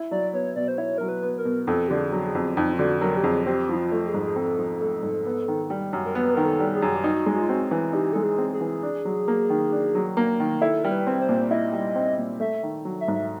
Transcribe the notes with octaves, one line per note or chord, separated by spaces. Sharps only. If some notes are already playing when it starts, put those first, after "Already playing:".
Already playing: E4
F#3 D5
B3 C#5
B2 D5
C5
E4 C#5
F#3 A#4
B4
B3
A#4
B2
F2 A4
D3 G4
G#4
F#3
G#4
F2
F2 D#4
F4
D3 F#4
F#3 A#4
G4
F2 G#4
C4 G4
F3 E4
F4
A3
G#4
G#2
G#4
C4 A4
F3
A3
G#2
B3
D#3
G3
F#2
A#4
B3 B4
D#3 A#4
A4
G3
G#4
F#2
G4
D#4 F#4
G#3
F#4
F4
C4 F#4
E3
D#4 G4
G#3 A4
G#4
C4
G#4
E3
D4
F#3
A#3
D#3
D4
F#3
A#3
D#3
E4 A4
G3 A#4
B4
C4
C5
A#2
E4 D#5
G3
C4
A#2
A3 E5
D#3
F#3
E5
G#2
E5